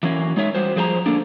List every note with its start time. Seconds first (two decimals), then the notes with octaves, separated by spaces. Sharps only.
0.03 E3 F#3 A#3 C#4
0.37 G#3 D#4 C#5 E5
0.55 G3 F#4 C5
0.76 F3 G#4 C5 G5 A#5
1.06 D3 A#3 D4